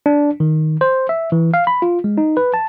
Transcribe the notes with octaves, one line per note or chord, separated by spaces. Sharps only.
D4
D#3
C5
E5
E3
F5
B5
F4
G#3
D#4
B4
A5